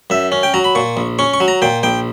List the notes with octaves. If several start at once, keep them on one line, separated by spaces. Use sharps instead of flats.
F#2 E5
C#4
G5
F#3 A#5
B5
A#2 C#6
A#1
C#4 C#6
C#6
F#3
A#5
A#2 G5
A#1 G5